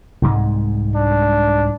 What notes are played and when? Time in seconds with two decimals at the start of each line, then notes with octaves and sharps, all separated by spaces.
0.22 C2 G#2 G#3
0.95 D4